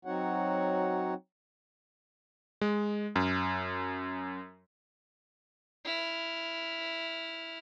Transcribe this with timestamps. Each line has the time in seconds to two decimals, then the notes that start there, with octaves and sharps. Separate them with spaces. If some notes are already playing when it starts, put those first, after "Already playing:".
0.05 F#3 C4 D#4 F#4 C#5 F#5
2.61 G#3
3.16 F#2
5.85 E4 F6